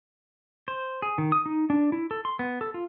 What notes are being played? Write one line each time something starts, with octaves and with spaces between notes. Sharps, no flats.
C5
G#4
D#3
D#6
D#4
D4
E4
A4
C6
B3
A4
F4